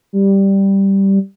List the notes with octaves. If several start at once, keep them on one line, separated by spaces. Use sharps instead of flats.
G3